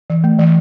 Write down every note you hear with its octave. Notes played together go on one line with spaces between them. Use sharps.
E3
A3
E3